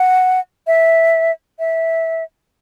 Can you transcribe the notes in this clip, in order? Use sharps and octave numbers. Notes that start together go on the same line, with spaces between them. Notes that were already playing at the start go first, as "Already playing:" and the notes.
Already playing: F#5
E5
E5